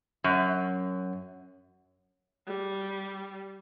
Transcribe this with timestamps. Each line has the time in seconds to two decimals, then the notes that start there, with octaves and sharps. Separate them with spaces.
0.24 F#2
2.47 G3